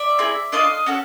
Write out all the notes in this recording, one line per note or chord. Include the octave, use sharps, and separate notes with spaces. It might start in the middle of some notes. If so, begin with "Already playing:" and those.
Already playing: D5 E5
C4 E4 G#4
D4 F4 A4 D#5 F5
C#4 F#4 A4